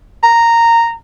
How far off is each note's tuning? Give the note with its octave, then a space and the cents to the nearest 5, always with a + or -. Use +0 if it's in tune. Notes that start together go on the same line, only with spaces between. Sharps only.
A#5 -10